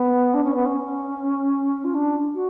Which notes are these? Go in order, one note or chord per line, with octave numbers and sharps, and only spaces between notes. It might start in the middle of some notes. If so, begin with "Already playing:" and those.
Already playing: B3
D4
C#4
B3
C#4
F4
D4
F#4